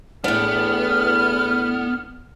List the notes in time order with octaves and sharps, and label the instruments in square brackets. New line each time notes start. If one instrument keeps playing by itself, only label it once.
[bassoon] E2 [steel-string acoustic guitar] A2 D4 [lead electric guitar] B3 [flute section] F6